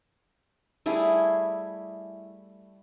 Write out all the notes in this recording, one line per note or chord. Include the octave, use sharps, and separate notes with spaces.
G3 A3 E4 G#4